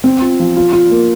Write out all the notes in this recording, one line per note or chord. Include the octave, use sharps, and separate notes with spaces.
C4
F4
F3
F4
F4
A#3